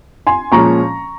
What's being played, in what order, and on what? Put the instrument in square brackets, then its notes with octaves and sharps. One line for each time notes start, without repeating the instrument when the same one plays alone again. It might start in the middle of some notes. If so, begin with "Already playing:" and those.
[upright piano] G#5 C6
[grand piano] A#2 F3 G#3 C#4 [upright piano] A#5 C#6